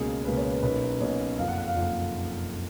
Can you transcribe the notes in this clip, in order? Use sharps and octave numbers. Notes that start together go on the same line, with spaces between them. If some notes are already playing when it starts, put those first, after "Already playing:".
Already playing: C#2 B2 A#3 C#4 G#4
C#2 B2 A#3 C#4 B4
C#5
B4
B1 B2 A#3 C#4 B4
B1 B2 A#3 C#4 C#5
F#1 F2 F3 F5
F#5
F#5
F5
F#1 F2 F3